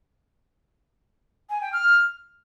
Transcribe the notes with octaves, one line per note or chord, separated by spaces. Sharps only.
G#5
G5
F6